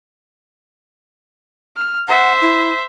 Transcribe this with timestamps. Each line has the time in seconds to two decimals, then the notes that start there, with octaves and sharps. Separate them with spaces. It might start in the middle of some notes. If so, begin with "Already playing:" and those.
1.76 F6
2.08 C5 E5 F#5
2.42 E4